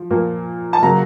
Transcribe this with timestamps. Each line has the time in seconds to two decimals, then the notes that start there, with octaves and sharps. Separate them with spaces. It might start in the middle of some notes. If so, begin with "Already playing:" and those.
Already playing: F3
0.10 A#2 F3 A#3
0.73 A5
0.82 C#3 F#3 A#3 A#5